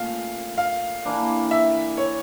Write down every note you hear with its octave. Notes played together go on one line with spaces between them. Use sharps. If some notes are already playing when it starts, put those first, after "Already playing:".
Already playing: A#2 A3 C#4 F5
F5
E3 A#3 D4
E5
C#5